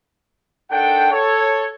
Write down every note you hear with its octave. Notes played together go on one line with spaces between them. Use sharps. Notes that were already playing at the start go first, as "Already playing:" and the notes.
D#3 D4 A4 F#5 G5
A4 C#5